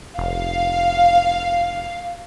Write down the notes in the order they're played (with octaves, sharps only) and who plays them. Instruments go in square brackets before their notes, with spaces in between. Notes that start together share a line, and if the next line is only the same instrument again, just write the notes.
[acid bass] F1 [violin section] F5